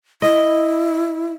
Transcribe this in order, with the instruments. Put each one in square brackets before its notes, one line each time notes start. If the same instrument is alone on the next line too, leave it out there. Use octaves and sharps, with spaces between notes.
[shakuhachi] E4 [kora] D#5